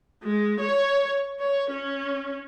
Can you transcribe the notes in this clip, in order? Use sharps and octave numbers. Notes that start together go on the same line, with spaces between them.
G#3
C#5
C#5
C#4